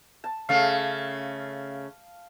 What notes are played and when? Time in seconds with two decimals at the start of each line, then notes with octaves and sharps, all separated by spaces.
0.24 A5
0.49 C#3 A3 F5